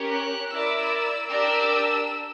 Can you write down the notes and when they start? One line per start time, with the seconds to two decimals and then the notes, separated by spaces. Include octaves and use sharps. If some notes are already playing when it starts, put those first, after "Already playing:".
Already playing: C#4 G4 A#4 C#5
0.11 F#6
0.50 E4 A#4 D5 E6
1.29 D4 G4 A#4 D5 G5 E6